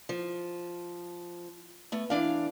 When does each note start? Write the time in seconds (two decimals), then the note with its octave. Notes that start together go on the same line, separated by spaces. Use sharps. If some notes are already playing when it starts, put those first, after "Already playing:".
0.09 F3
1.92 A3 B3
2.10 E3 D4 F5